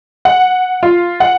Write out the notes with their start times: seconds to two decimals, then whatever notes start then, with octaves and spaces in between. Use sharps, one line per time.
0.25 F#5
0.83 F4
1.20 F#5